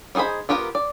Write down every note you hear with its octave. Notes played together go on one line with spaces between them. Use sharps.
G3 D#4 G#4 C5 B5
B3 F4 G4 A#4
D5